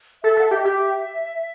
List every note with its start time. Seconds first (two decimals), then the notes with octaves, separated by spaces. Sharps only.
0.23 A4 E5
0.37 A4
0.40 F#5
0.44 E5
0.51 G4
0.57 D#5
0.61 G4 E5